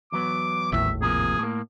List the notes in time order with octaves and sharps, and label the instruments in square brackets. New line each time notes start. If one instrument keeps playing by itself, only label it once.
[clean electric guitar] E2 F#3 B3 [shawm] D6
[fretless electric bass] G#1 D#2 A2 [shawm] E5
[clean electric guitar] C3 F3 A#3 [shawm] G#4
[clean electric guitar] A2 A#3